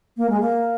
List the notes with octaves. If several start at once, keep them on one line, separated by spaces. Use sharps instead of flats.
A#3
G#3
A#3